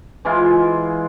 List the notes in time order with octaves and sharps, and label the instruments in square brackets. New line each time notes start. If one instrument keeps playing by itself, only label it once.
[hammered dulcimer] E3 G#3 F4